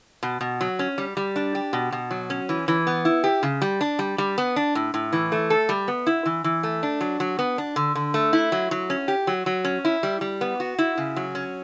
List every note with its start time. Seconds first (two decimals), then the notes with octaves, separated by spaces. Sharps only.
0.23 B2
0.41 B2
0.61 F#3
0.79 C#4
0.98 G3
1.17 G3
1.36 D4
1.55 G4
1.73 B2
1.92 B2
2.11 F#3
2.30 C#4
2.49 E3
2.68 E3
2.87 B3
3.05 E4
3.24 G4
3.43 C#3
3.62 G3
3.81 D4
3.99 G3
4.18 G3
4.38 B3
4.56 D4
4.75 A2
4.94 A2
5.13 E3
5.32 A3
5.50 A4
5.69 G3
5.88 B3
6.07 E4
6.26 E3
6.44 E3
6.63 A3
6.83 D4
7.01 F#3
7.20 F#3
7.39 B3
7.58 D4
7.76 D3
7.95 D3
8.14 A3
8.33 E4
8.52 F#3
8.71 F#3
8.90 C#4
9.08 G4
9.27 F#3
9.46 F#3
9.65 C#4
9.85 E4
10.03 G3
10.21 G3
10.41 B3
10.60 F#4
10.79 E4
10.98 C#3
11.16 F#3
11.35 C#4